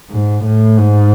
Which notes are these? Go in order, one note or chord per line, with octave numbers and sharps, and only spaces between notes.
G#2
A2
G#2